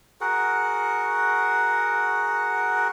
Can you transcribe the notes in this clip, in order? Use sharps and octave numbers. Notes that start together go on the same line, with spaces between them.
F#4 G#4 A#4 F#5